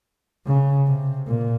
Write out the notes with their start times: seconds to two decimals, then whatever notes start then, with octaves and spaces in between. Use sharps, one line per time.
0.46 C#3
0.87 C3
1.27 A#2